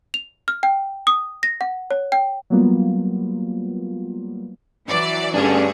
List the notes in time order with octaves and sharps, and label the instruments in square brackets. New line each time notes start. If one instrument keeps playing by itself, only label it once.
[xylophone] F7
F6
G5
D#6
A#6
F#5
C#5
G5
[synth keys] F#3 G3 A#3 B3 F4
[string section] E3 F#3 D5
[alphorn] G2 [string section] D3 A3 G#4 [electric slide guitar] C#4 D4